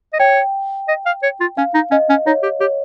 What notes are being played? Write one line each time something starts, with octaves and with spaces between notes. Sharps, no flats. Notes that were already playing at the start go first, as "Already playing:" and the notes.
D#5
C#5 G5
D#5
F5
C#5
F4
C#4 F5
D#4
C#4 D#5
C#4
D#4 C#5
G4
G4 C#5